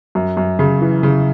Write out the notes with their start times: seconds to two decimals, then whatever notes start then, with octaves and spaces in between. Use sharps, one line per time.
0.15 F#2
0.37 F#2
0.59 C#3
0.81 E3
1.03 C#3